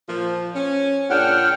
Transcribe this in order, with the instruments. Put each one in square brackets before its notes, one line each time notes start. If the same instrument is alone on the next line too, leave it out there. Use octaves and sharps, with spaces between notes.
[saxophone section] A#2 F3
C#4
[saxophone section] A#2 C#3 D4 [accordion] F#5 G5 F6